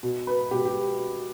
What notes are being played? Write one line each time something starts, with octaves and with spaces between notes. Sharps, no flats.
B2
B4
B2 G4
G4